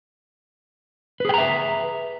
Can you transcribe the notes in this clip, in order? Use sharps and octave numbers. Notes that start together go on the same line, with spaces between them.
G#4 B4 E5 G5 A#5